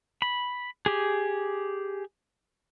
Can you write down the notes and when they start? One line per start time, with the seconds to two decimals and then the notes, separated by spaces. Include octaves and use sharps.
0.22 B5
0.86 G4 G#4